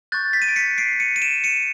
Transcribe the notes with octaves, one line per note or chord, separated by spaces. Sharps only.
C#6 F#6 G6 A6
A6 B6
D#7
D7
B6 C#7
C7 D7
C#7 D#7
D#7
D7 E7
C#7 D#7